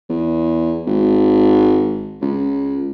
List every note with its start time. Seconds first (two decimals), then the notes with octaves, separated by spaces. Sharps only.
0.09 E2
0.86 G#1
2.21 C#2